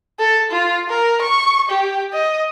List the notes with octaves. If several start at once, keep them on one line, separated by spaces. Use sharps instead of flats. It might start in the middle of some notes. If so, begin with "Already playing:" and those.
A4
F4
A#4
C#6
G4
D#5